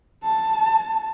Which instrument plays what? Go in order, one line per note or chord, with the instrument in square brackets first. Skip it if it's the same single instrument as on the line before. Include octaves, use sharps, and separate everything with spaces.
[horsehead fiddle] A5